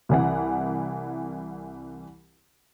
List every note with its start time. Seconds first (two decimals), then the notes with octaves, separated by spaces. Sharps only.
0.09 C2 E3 F#5